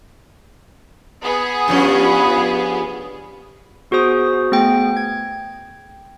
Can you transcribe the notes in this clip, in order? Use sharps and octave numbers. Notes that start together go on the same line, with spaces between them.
B3 G#4
G2 F3 C#4
B3 F#4 G#4 C5 D#6
A3 B3 G#4 G5 A#6
G5 G#6